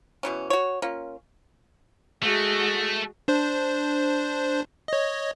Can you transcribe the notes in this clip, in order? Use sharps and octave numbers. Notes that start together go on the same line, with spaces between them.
B2 E3 C#4
F#4 C#5
A#3 C#4 F4
G#3 A3 F#4
D4 C5
C#5 D#5